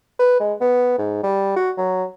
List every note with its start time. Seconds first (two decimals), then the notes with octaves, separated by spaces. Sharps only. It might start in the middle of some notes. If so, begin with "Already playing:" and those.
0.19 B4
0.40 G#3
0.61 B3
0.98 G#2
1.23 G3
1.56 F#4
1.78 F#3